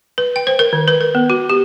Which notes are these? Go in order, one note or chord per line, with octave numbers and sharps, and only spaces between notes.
B4
G5
C5
A#4
D#3
B4
A#4
B3
F#4
G4